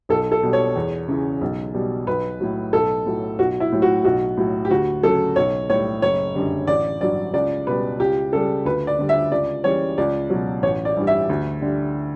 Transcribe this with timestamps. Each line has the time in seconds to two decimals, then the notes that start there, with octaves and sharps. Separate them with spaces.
0.09 B1 A4
0.32 A4
0.43 B2 G3
0.53 C#5
0.76 E2
1.08 C#3 E3
1.41 B1
1.74 B2 G3
2.07 B1 B4
2.40 A2 F#3
2.73 B1 A4
3.06 A2 F#3
3.39 B1 F#4
3.60 E4
3.72 A2 F#3
3.82 F#4
4.04 B1 F#4
4.37 A2 F#3
4.65 G4
4.71 D2 F#4
5.03 C#3 F#3 A4
5.36 B1 C#5
5.70 A2 G3 C#5
6.02 F#1 C#5
6.35 F#2 D3 G3
6.67 A1 D5
7.00 G2 F#3 D5
7.33 C#2 D5
7.67 B2 G3 B4
8.00 C#2 G4
8.32 C#3 G3 A4
8.65 D2 B4
8.87 D5
8.99 D3 G3
9.09 E5
9.31 C#2 D5
9.64 C#3 E3 G3 C#5
9.98 C#2 D5
10.30 B2 F#3
10.63 A1 C#5
10.85 D5
10.96 G2 E3 G3
11.07 E5
11.29 D2
11.62 D3 G3